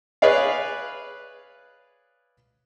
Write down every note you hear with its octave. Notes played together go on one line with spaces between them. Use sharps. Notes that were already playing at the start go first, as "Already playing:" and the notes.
G#4 B4 C#5 D5 F5